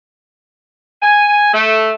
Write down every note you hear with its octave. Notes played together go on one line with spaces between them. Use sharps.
G#5
A3